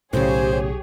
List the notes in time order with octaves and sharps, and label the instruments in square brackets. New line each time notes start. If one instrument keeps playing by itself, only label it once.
[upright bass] B1 [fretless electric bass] A2 C#3 [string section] G4 G#4 C#5 [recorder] C5